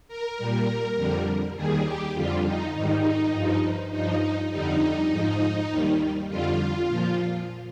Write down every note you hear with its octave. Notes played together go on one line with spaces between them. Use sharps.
A#4
A#2 G3
F2 D3 G3
D#2 D#3 G3 G#4
G4
F2 D3 G3 F4
D#4
G#2 D#3 G3 D#4
G2 F3
G2 F3 D#4
F2 D3 G3 D#4
G#2 F3
D#2 D#3 G3
F2 D3 G3 F4
A#2 F3